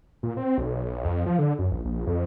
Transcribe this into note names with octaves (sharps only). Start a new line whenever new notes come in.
A#2
C4
B1
F2
F3
D3
F#2
A#1
A#1
F2